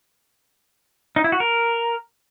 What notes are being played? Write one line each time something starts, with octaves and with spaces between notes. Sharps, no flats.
D#4
E4
F#4
A#4